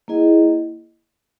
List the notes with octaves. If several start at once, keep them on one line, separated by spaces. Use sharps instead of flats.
A#3 E4 G#4 D#5 F#5